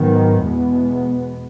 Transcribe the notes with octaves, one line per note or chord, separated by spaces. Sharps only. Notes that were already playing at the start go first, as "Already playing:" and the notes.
Already playing: G#2 D#3 F#3 B3
E2 B2 G#3 B3